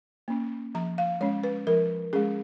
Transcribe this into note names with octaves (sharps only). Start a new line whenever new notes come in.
A#3 C#4
F3 A#5
F5
G#3 C#4 C#5
B4
F3 A#4
G#3 C#4 G#4